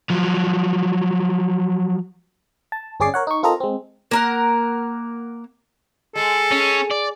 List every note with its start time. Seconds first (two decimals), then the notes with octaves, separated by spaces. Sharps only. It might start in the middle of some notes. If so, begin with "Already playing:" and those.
0.10 F3 F#3
2.72 A5
3.00 G1 C#4 G#4 D5 D6 C7
3.14 A#4 C#5 F#5
3.27 D#4 C#6
3.43 C4 F4 A4 A#4 D#5 A#5
3.60 G#3 C4
4.11 A#3 A#4 F#5
6.15 G#3 A4
6.51 C#4
6.91 D5